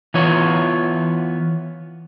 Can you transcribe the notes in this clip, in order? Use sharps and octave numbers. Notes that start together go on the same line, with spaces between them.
E3 B3 F4 C#5